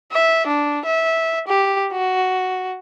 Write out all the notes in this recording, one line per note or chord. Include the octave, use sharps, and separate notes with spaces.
E5
D4
E5
G4
F#4